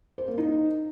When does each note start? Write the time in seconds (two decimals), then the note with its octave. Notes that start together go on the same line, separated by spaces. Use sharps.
0.18 C5
0.28 A#3
0.38 D#4